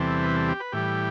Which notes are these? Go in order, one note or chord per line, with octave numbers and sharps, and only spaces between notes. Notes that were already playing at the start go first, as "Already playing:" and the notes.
Already playing: E2 C3 E3 G3 C4 A4
B4
A4
G4
B4
A2 E3 G3 G4